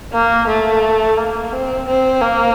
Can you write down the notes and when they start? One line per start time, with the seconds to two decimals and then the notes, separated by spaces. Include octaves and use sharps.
0.12 A#3
0.47 A3
1.17 A#3
1.52 C4
1.87 C4
2.22 A#3